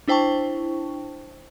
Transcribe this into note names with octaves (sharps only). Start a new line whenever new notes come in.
D4 E4 C5 G5 A5 C#6